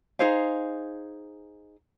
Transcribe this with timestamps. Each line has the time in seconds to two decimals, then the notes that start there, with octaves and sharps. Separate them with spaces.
0.19 D#4 G#4 C5 F5